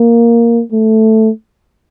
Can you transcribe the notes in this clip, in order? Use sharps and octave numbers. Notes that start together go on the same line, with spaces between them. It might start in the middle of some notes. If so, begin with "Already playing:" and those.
Already playing: A#3
A3